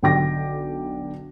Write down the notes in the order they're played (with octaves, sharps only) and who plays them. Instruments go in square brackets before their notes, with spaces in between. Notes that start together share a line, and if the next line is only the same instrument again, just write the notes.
[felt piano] B1 D3 G5 D6 A#6